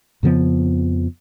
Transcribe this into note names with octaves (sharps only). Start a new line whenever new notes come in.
F2 C#3 F3 B3